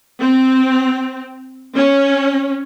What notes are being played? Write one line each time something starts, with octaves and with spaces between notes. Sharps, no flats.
C4
C#4